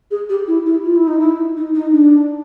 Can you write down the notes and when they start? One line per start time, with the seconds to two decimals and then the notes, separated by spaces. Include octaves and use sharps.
0.11 G#4
0.29 G4
0.47 E4
0.66 E4
0.84 F4
0.96 E4
1.07 D#4
1.20 E4
1.57 D#4
1.75 D#4
1.93 D4